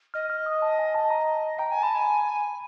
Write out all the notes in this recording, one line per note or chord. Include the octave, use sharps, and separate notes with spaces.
D#5 F6
F6
D#6
A5
G#5
A5
A#5
G5 A#5
G#5
A5 B5
G#5